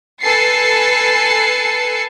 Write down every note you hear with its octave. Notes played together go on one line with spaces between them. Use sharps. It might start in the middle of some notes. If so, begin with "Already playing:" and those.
A4 B4 G#5 A6 C7 C#7